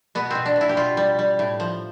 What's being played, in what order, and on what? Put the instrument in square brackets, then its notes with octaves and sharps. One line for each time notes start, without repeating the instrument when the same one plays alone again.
[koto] B2 B3
B2 C4
D4
B2
E4
G4
B2 F4
G3
G3
A2
F3